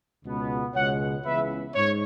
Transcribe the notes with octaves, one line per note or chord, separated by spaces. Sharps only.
C#2 B2 B3
C#2 B2 G#3 C#5 F#5
C#2 C#3 E3 B3 B4 E5
G#2 C#5